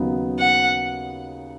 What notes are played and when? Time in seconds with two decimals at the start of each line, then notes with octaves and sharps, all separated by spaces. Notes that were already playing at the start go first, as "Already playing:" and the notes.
Already playing: D#2 C#3 F#3 B3 D#4
0.39 F#5